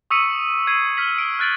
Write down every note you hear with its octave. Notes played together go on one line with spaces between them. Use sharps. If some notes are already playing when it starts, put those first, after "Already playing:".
C#6 D#6 E6 B6 C#7 D#7
E6 G#6 C7 D#7
F6 B6 F#7
D7
F6 F#6 A6 D7 F#7